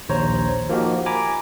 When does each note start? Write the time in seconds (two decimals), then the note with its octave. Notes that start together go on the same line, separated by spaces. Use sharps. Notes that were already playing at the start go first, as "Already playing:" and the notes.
0.09 A#1 D#2 C5 C#5 A#5
0.69 F3 A#3 D#4 F#4 G4
1.06 G#5 A#5 B5 D6